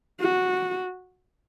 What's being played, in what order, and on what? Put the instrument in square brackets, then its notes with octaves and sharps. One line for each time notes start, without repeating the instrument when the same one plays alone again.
[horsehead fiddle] F#4